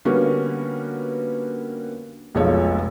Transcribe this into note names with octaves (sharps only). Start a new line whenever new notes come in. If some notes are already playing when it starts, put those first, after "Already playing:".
D3 G3 A#3 B3 C#4 F#4
F1 B1 F3 G#3 A4 C#5